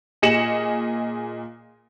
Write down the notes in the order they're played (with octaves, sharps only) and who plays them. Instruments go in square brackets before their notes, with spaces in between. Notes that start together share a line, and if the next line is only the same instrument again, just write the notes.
[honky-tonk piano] A#2 G#4 D#5 C#7 E7 F#7